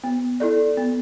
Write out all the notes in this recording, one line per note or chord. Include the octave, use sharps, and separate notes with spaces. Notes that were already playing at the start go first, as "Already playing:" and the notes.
B3
E4 A4 D5
B3